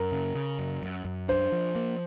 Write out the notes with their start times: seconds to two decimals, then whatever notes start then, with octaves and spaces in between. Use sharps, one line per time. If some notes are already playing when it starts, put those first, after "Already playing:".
Already playing: F#2 A#4
0.12 C#3
0.35 C#3
0.59 F#2
0.82 F#2
1.05 F#2
1.28 D4 C5
1.52 F3
1.76 A#3